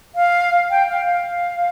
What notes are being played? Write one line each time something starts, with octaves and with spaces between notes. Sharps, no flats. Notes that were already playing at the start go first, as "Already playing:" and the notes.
F5
G5
F5
F5